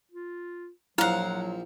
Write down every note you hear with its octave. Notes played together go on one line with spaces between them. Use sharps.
F4
A#1 F3 F#3 E4 F5 F#5